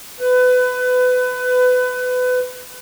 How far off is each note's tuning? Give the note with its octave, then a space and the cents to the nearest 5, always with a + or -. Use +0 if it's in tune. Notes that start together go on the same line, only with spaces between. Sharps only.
B4 +25